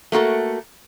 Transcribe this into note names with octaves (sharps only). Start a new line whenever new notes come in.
A3 A#3 F#4 A4